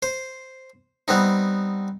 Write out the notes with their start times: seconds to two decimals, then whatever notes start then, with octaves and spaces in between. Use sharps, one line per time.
0.03 C5
1.08 G3 B3 C4 D#4